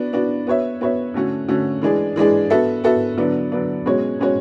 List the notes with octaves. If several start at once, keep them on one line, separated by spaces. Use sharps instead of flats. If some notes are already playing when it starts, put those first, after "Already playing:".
Already playing: B3 D4 F#4
B3 D4 F#4
B3 F#4 C#5 E5
B3 F#4 C#5 E5
D3 A3 C#4 F#4
D3 A3 C#4 F#4
E3 G#3 D4 G#4
E3 G#3 D4 G#4
B3 F#4 A4 E5
B3 F#4 A4 E5
D3 F#3 B3 D4
D3 F#3 B3 D4
B2 G#3 C#4 F#4 C#5
B2 G#3 C#4 F#4 C#5